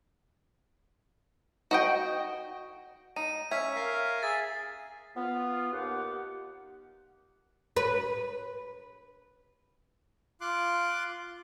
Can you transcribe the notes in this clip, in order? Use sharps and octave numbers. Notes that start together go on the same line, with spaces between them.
F#4 D#5 G5
D#4 D#7
C#4 E5 G#6 B6
A#4 F5
G#4 E5 A6
B3 F4
D#2 G4 F#5
B4
F4 C6 D6 F#6